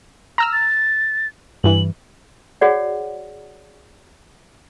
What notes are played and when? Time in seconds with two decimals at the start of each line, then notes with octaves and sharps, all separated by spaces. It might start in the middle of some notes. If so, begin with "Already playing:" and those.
0.38 A#5 E6 F6
0.53 A6
1.64 G2 E3 F#7
2.61 F#4 G#4 C#5 D5 F#5